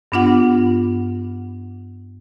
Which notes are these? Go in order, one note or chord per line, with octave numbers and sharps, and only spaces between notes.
G2 B3 D4 F4 F#5